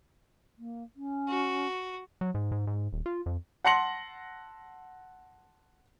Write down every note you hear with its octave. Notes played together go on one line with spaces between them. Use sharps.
A#3
C#4
F#4
F#3
G#2
G#2
G#2
D#1
F4
F2
F#5 A5 C6 A#6 C#7 F#7